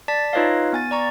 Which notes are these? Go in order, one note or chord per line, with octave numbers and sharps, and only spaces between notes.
D5 A5 A6 B6
D#4 F4 B4 C#5 D#5 F5
B3 G#5 A6
D5 A#5 C#6